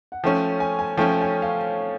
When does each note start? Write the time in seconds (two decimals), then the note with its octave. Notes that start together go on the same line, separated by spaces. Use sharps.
0.12 F#5
0.24 F3 A3 C#4 G5
0.60 G#5
0.79 G#5
0.97 F3 A3 C#4 G5
1.21 G#5
1.42 F5